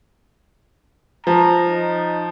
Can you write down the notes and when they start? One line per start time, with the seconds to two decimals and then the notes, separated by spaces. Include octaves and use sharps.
1.27 F3 A#5
1.67 D#4